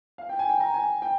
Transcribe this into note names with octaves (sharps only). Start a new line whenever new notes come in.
F5
G5
G#5
G5
A#5
G#5
G5